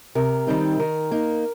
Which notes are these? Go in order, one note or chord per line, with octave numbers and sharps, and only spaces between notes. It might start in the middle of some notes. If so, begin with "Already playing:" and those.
C3 A#4
D#3 G3 C4 D#4
D#3 A#4
A#3 D#4